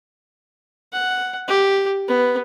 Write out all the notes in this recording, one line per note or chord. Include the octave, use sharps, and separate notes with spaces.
F#5
G4
B3